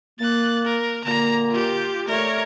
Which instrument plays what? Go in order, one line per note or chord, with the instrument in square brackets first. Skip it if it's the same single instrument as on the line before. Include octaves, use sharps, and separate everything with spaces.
[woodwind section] A#3 [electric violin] F#6 A6
[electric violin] A#4
[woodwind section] A#2 D3 A#3 [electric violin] A#5
[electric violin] F4 G4
[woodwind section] A3 D5 [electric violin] A#4 C#5